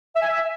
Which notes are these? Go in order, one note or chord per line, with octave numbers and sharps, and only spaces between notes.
E5
G#5
E5